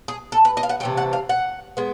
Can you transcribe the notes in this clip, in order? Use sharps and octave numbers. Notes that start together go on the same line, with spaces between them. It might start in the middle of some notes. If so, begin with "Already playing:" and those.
G#4
A4
B4
D#5
F5
F#5
C3 E3 A3 G5
F#5
F5
F#5
G#3 B3